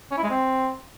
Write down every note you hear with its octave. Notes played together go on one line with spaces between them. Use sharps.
C#4
E4
G#3
C4